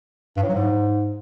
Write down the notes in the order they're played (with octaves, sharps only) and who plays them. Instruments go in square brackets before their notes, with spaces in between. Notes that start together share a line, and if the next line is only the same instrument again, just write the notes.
[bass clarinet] G2
A2
F#3
G#2